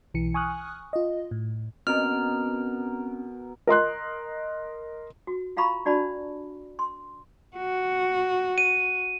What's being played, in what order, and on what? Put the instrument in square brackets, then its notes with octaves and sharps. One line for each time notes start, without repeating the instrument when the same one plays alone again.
[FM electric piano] B1 E3 C#7
G#5 C#6 D#6 F6 F#6
F4 D#5
A2
[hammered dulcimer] B2 A#4 [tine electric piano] C4 C#4 [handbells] F6
[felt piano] A#4 D#5 C6 F#6
[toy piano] F#4
F4 F5 A#5 B5 C#6
D4 F#4 D5 A5 B5
C6
[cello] F#4
[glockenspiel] D#7